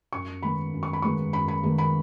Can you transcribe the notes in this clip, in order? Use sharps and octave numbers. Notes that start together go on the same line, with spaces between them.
F#2 C#6
D#3 G#3 B3 D#4 B5
F#2
C#6
B5
D#3 G#3 B3 D#4 C#6
F#2 B5
B5
D#3 G#3 B3 D#4
B5